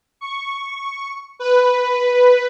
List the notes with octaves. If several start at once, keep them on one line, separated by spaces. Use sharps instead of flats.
C#6
B4